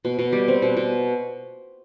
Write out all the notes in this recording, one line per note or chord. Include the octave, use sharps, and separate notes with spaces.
B2
B2
G3
C4
B2
B2